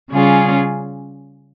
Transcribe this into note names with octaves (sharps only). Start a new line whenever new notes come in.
C#3 G3 C#4 F4 G#4